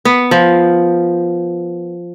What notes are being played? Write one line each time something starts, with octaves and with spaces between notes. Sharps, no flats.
B3
F3